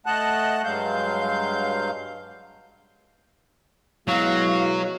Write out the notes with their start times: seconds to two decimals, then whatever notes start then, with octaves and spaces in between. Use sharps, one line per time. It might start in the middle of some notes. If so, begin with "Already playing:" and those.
0.06 A3 D#5 F#5 A5 F#6
0.64 G2 F#3 G#3 F5 G6
4.08 B2 F#3 G#3 E4 F5